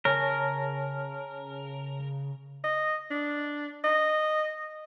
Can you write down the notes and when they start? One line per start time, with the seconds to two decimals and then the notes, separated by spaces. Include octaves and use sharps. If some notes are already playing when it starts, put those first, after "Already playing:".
0.05 C#3 A#4 C#5 G#5 A5
2.64 D#5
3.11 D4
3.84 D#5